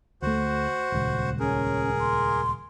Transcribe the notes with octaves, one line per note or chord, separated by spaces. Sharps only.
D2 A3 F#4 C5 F#5
D#1 C#2
C#4 G#4 A#4
C6